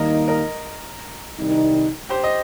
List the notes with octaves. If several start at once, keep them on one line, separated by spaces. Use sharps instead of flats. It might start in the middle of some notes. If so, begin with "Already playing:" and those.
Already playing: D#2 D#3 G3 A#3 D#4 A#4 D#5
A#4 D#5
C2 C3 D#3 G3 D#4
G4 C5
D#5